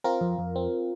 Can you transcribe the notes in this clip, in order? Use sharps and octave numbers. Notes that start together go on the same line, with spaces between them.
C4 F4 A#4
F2
F2
C4